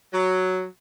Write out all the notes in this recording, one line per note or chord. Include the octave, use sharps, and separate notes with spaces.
F#3